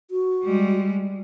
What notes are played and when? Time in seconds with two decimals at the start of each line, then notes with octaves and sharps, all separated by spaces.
0.11 F#4
0.44 G3 G#3